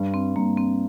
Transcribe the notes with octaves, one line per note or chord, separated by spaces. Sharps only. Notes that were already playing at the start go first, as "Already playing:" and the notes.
Already playing: G2
C4
G2 A#3
C4